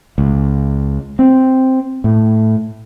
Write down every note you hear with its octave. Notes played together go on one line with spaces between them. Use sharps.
C#2
C4
A2